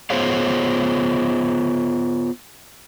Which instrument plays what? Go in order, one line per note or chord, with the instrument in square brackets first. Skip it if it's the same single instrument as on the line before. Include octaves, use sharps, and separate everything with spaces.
[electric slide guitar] B3 F4 G#4 C5 C#5 F5